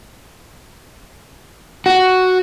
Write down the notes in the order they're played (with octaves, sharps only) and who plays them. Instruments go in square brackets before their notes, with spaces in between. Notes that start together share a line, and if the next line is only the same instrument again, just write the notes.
[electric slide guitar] F#4